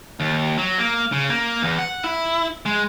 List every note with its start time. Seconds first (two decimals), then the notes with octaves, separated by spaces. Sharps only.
0.20 D#2
0.58 F#3
0.78 A#3
1.12 C#3
1.29 A#3
1.62 E2
1.79 F#5
2.04 E4
2.66 G#3